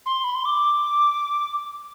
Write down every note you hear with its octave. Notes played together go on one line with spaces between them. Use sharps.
C6
B5
C6
D6